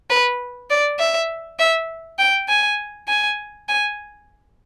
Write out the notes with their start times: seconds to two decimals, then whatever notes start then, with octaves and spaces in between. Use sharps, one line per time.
0.10 B4
0.70 D5
0.99 E5
1.59 E5
2.19 G5
2.49 G#5
3.08 G#5
3.69 G#5